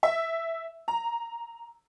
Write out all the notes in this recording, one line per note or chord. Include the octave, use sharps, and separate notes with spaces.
E5
A#5